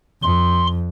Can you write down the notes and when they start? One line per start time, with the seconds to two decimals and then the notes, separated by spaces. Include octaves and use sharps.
0.23 F2 C6